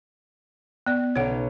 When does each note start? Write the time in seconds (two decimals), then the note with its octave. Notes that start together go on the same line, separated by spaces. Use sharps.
0.86 B3 D5
1.16 B1 C#4 C#5 F#5